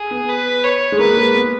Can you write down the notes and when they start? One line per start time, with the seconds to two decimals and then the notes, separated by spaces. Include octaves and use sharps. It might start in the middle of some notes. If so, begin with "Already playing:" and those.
Already playing: G#4
0.11 B3
0.28 B4
0.64 C#5
0.92 G#3
0.99 A#3 B4
1.17 G#3
1.34 B3